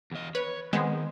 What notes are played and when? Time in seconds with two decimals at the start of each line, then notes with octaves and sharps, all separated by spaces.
0.12 E2 D#5
0.35 B4 C#5
0.73 D#3 G#3 B3 C4